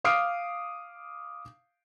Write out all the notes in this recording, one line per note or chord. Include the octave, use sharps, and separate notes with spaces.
F5 D6 D#6 F6 C7 D7